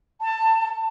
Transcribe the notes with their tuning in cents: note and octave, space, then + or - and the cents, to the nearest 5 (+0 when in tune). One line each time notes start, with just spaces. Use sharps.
A5 +20